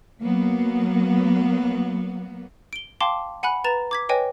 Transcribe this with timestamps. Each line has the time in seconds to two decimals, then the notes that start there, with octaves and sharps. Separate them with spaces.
0.23 F#3 A#3 B3
2.73 D7 G7
3.01 F5 G5 A5 C6 D6
3.43 F#5 G#5 B5 F#6
3.64 B4 A#5 A6 E7 F7
3.91 D6 G#6 B6
4.09 B4 C#5 D#5 G5 G#5